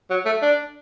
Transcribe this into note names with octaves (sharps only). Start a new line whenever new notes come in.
F#3
A3
D4